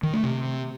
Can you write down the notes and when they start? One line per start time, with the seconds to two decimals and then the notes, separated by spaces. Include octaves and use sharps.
0.03 D#3
0.13 A3
0.23 C3